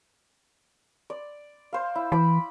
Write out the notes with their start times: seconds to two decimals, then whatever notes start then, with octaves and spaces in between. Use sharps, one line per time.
1.10 D5
1.73 C5 F5
1.95 E4
2.12 E3 B5 D6